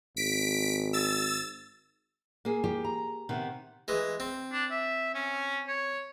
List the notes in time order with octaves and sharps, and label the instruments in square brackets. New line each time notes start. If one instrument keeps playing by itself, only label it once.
[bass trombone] G#1 [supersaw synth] B6 D7
[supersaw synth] E6 A6
[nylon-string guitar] A#3 G#4
[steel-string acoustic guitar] G4
A#5
[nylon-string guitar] C3 D#3 B3
[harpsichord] E3 G#3
C4
[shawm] D4
E5
C#4
C#5